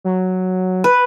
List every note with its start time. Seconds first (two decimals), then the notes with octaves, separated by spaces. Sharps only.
0.04 F#3
0.84 B4